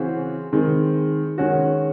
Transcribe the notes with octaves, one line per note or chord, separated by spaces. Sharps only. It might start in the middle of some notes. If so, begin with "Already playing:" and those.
Already playing: C#3 E3 C4 F#4 C5
D#3 G#3 C4
D#3 G#3 C#4 F#4